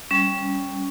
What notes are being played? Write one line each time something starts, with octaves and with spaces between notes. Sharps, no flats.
G3 C#4